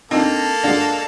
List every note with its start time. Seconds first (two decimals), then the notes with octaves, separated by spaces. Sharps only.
0.11 A#3 C4 D4 D#4 A4
0.63 G#3 D4 D5 F5 F#5